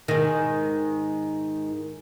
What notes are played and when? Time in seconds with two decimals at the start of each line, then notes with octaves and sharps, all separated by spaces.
0.08 G#2 D#3